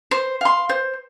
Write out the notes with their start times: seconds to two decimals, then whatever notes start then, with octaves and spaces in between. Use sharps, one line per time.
0.11 C5
0.41 F5 C6
0.69 C5